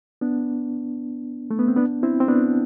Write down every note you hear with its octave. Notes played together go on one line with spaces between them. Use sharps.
B3 D4
A3
B3
C4
B3 D4
C4 E4
C4
B3 D4